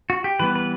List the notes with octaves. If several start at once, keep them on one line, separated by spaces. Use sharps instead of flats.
F#4
G4
E3 G3 B3 B4
B4